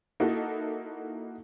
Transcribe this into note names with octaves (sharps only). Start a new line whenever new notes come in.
A#3 D#4 E4 F#4 A4